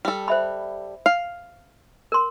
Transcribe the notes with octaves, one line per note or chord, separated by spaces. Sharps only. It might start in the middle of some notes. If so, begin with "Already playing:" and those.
G3 A4
C5 E5 B5
F5
A#4 C6